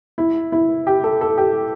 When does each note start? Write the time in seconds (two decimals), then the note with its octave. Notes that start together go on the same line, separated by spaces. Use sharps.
0.18 E4
0.52 E4
0.87 G4
1.04 A4
1.21 A4
1.38 G4